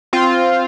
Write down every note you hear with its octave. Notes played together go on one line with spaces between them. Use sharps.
C4 F4